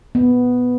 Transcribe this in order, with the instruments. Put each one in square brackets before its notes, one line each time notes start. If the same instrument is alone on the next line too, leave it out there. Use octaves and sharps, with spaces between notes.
[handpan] B3